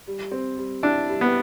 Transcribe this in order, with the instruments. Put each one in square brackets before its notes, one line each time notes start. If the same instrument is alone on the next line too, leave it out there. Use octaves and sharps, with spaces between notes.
[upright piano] G3
C4
G3
[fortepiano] D4 [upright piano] E4
[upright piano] G3
[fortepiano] B3